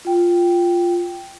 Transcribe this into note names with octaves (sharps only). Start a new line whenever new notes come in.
F4 G5